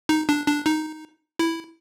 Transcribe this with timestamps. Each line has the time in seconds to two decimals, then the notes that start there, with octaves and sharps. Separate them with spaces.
0.09 D#4
0.29 D4
0.47 D4
0.66 D#4
1.39 E4